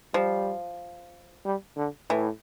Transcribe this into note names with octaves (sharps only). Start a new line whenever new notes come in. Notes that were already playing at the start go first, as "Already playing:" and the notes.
F3 G3
G3
D3
A2 E3